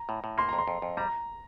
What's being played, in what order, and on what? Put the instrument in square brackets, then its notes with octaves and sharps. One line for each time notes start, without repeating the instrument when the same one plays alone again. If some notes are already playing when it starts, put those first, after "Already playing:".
Already playing: [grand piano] A#5
[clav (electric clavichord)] A2
A2
[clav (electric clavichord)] A#3 [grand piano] C6
[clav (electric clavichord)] F2 [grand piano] A#5
[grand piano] C6
[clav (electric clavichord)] F2
F2
[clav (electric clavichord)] G3 [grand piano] A#5